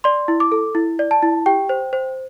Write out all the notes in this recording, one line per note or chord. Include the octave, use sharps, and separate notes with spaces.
D5 C6
E4
D6
A4
E4
D5
A5
E4
G4 G5
C5
C5